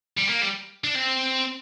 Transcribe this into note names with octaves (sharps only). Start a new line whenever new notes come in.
G3
A#3
G3
D4
C4